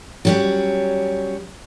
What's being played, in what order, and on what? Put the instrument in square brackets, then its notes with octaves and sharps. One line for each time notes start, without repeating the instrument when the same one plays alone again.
[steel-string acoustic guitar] F#3 G3 C#4